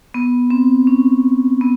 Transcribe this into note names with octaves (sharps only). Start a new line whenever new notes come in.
B3
C4
C#4
B3